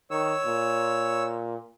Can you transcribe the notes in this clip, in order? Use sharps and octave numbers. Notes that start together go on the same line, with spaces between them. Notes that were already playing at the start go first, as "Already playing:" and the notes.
D#3 C#5 E6
A#2